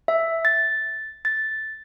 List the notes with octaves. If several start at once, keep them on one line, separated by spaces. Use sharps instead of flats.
E5
A6
A6